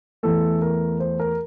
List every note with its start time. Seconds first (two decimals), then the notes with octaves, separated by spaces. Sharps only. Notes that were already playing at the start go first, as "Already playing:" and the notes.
0.23 E2 E3 A3 A4
0.62 A#4
1.00 C5
1.20 A#4